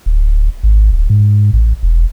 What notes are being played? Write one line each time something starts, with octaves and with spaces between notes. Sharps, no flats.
D1
G#1
D1
G#2
A1
E1